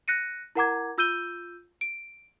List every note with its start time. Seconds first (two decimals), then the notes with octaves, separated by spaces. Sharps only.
0.08 F#6 A#6 C#7 D#7
0.55 E4 A#4 F#5 A#5 D6 G#6
0.98 F4 E6 G6 D#7 G7
1.81 D7